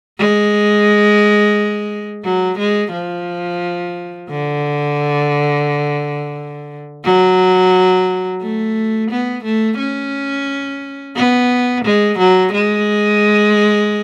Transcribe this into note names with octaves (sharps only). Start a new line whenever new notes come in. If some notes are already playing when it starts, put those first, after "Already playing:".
G#3
F#3
G#3
F3
D3
F#3
A3
B3
A3
C#4
B3
G#3
F#3
G#3